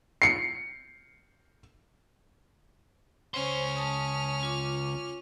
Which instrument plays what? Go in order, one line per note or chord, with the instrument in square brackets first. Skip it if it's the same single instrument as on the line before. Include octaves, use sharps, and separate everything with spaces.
[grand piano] C7 C#7
[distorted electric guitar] C#2 C6 [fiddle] C#4 F6 [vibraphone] C5
[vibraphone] A5 D#6
F4 D6